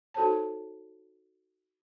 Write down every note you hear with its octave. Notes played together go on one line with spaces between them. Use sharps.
D#4 F#4 A4 C5 C#5 A5